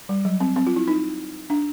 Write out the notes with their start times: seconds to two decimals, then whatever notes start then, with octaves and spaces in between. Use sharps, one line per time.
0.09 G3
0.25 F#3
0.40 C4
0.56 C4
0.67 F4
0.76 E4
0.88 D#4
1.50 D4